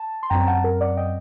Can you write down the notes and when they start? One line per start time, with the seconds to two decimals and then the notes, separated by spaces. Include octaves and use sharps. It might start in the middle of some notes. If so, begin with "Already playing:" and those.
Already playing: A5
0.23 C6
0.30 F#2 F#3 C4 G5 A#5
0.40 G5
0.47 F#5 A5
0.64 A#4
0.81 D5 F#5
0.97 D#5 G5